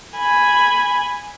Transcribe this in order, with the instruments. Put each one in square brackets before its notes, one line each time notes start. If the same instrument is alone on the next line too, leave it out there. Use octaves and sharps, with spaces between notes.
[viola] G#5 B5